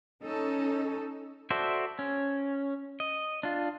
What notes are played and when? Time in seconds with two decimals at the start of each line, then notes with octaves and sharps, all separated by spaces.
0.23 C#4 D#4 A4
1.50 F#4 A4 C5 D5 E5
1.99 C#4
3.00 D#5
3.43 D4 F4